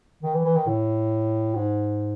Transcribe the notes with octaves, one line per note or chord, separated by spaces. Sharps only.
D#3
E3
E3
D#3
A2
G#2